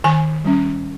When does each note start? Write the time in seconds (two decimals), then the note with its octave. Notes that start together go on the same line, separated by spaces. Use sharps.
0.04 D#3 G#5
0.44 G3 C#4